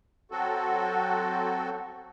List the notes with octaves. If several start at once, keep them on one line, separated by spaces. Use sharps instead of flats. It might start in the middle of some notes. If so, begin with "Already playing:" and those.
F#3 C4 F#4 A4